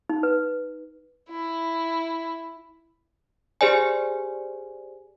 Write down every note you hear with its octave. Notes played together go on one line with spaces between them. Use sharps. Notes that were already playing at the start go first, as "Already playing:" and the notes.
D#4
B4
E4
G4 G#4 C5 D5 G#5